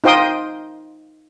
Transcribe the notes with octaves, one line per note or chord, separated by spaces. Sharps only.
D#4 F4 C5 G5 C6 D#6